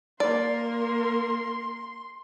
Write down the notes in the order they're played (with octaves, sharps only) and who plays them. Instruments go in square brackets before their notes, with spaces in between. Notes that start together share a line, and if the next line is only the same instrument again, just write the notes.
[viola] A#3 A#4 [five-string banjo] D5 [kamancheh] C6